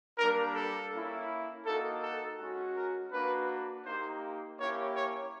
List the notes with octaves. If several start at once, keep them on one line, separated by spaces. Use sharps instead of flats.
G3 A#3 D4 A#4
A4
A#3 C#4 E4
A#3 D#4 F#4 A4
A4
G#3 C#4 F#4
A#4
A#3 D4 F#4 B4
A#3 D#4 G4 C5
A#3 C#4 E4 G4 C#5
C#5